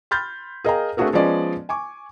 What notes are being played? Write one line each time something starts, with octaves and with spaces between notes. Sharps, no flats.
B5 C6 F6 G6 A6
G#4 A#4 D#5 F5 G5 A#5
A3 C4 D4 F#4 G#4 A#4
F3 G#3 B3 C#4 D5 D#5
G#5 C#6 D6